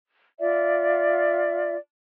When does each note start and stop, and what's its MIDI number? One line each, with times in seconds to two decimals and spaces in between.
0.40 1.76 65
0.40 1.76 74
0.40 1.76 76